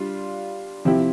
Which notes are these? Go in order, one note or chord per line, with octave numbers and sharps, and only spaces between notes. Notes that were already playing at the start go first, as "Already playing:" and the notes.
Already playing: G3 D4 F4
C3 F3 C4 E4 G4